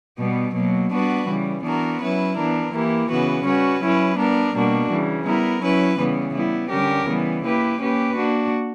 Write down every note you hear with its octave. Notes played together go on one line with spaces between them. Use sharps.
B2 G3 B3
B2 F#3 A#3
G3 B3 D4 F#4 B4
C#3 E3 G3
E3 B3 D4 F#4 A#4
F#3 C#4 E4 B4
E3 B3 D4 A#4
E3 A#3 E4 G4
C#3 E3 B3 F#4 B4
G3 C#4 F#4 B4
F#3 C#4 E4 B4
G3 B3 D4 A#4
B2 G3 A#3 D4 F#4
C#3 E3 G3
G3 B3 E4 A#4
F#3 C#4 E4 B4
C#3 E3 G3 B3
G3 B3 E4
D3 G3 C#4 G4 A#4
C#3 E3 G3 B3
A#3 E4 G4 B4
A#3 C#4 G4 B4
A#3 D4 F#4